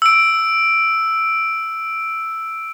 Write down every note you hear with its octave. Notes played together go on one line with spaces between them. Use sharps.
E6 D7